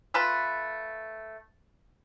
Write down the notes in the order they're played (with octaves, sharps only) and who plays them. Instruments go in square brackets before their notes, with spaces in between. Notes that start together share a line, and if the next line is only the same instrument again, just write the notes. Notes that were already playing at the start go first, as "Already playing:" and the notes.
[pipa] A3 F4 B4 A5